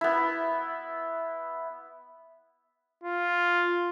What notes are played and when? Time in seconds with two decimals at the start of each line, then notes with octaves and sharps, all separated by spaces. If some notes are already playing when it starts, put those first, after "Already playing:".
0.01 B3 E4
3.03 F4